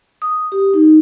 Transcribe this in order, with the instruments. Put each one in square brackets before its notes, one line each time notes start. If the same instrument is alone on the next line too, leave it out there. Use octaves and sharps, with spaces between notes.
[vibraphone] D#6
G4
D#4